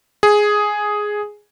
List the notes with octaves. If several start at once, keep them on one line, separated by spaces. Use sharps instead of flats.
G#4